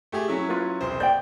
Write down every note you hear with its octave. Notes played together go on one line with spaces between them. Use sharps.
A3 G4 G#4
F#3 C#4 E4
F4 B4
E1 C2 C5
D5 G5 G6